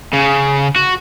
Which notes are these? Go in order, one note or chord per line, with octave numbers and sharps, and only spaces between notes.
C#3
F#4